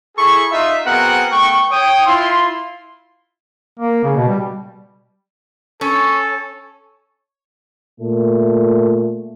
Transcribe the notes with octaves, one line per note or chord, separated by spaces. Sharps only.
E4 G#4 A4 B5 C#6
D#4 F4 E5
B3 C4 F#4 G#4 A#4 F#5
A3 B3 G5 C#6
C#5 G5 D#6
E4 F4 C6
A#3
C#3
B2
G3
C#4 A4
A#2 A3